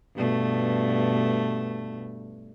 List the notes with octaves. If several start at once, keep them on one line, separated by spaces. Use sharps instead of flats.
G2 B2 A3